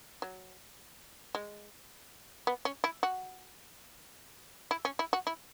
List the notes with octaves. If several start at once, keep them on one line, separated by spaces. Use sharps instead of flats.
F#3
G#3
B3
C#4
E4
F#4
E4
C#4
E4
F#4
E4